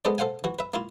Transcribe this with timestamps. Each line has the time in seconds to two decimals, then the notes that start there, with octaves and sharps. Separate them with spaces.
0.05 G#3 B3 A4 C5 D5
0.18 A4 C5 F5 F#5 G#5
0.44 E3 F#4
0.59 B4 E5
0.74 A#3 E4 F4